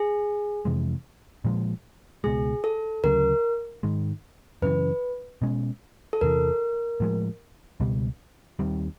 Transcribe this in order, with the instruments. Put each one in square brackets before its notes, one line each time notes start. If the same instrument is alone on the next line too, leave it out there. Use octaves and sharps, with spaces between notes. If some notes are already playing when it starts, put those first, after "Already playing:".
Already playing: [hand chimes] G#4
[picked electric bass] F2 C3 E3 G#3
A#2 F3 G#3
[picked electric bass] C#2 B2 G#3 [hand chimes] G#4
[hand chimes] A4
[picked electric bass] D2 C#3 F#3 [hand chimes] A#4
[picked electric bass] G#2 D#3 G#3
[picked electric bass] F#2 C#3 E3 [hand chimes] B4
[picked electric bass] B2 G#3 C#4
[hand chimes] A4
[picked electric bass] E2 C3 E3 [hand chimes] A#4
[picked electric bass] A2 F3 G#3
C#2 B2 G3
D#2 D#3 G3 C4